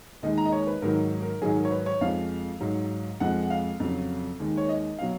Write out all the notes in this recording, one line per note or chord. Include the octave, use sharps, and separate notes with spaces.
D#2 D#3 G#3 D#5
A#5
D#5
C#5
B4
G#2 D#3 F#3 A#4
A#4
G#2 D#3 F#3 G#4
A#4
C#5
B4
C#5
F2 F3 G#3 F5
G#2 F#3
F2 F3 G#3 F#5
F#5
F5
F2 C#3 F#3
D#2 D#3 G#3
C#5
D#5
B2 F#3 F5